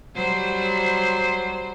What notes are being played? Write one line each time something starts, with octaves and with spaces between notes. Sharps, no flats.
F#3 G3 C5